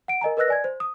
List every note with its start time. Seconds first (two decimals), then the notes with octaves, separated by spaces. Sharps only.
0.08 F#5 D7
0.21 A#4 D#5 G#5 A#5
0.37 A#4 B4 D#5 E6 F#6 A#6
0.48 D5 G#5 G#6
0.64 C5
0.80 D#6